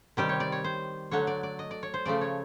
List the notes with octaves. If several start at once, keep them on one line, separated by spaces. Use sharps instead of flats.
C3 D#3 G3 G4
C#5
D5
C#5
C5
D3 F#3 A3 C#5
D5
D5
D#5
D5
C#5
C5
C#3 F3 A3 D5
C#5